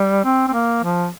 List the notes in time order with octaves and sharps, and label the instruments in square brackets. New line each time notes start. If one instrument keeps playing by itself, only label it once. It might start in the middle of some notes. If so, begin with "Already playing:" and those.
Already playing: [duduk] G3
C4
C4
A#3
F3